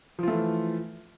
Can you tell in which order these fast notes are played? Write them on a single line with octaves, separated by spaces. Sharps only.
F3 F4 A3 E3